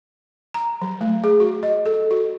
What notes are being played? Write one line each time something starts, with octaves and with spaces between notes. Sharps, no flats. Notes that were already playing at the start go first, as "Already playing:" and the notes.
A#5
F#3
A3
G#4
F#4
D#5
A4
F#4